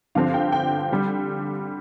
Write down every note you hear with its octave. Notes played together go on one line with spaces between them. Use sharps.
G2 D3 F3 C4 F5
G5
G5
D3 G3